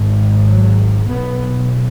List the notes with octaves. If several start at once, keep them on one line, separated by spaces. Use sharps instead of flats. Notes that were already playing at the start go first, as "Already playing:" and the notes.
Already playing: G#1 G#2
F#3
B1 B2 B3